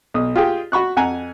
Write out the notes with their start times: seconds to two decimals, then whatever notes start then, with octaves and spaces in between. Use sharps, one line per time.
0.14 B1 D#6
0.36 F4 G4 G#4 G5
0.72 F#4 B5 C#6 F#6
0.96 F2 F#5 G#5 A#5